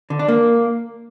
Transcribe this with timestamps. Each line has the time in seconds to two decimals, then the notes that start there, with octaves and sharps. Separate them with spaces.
0.10 D3
0.19 D4
0.28 A#3